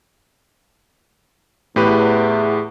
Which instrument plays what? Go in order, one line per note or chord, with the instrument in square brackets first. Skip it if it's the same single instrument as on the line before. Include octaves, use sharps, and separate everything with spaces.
[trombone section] E2 [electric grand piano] A2 G4 B4